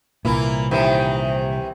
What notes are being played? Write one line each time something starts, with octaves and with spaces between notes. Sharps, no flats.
C2 A#2 E3 A#3 E4
C3 D#3 E3